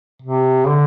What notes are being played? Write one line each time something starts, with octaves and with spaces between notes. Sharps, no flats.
C3
D3